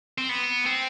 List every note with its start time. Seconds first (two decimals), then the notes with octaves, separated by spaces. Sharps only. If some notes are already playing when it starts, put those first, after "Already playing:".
0.18 C4
0.29 B3
0.66 C4